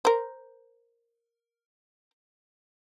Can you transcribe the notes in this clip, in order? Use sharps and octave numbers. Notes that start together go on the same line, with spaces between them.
A#4 C5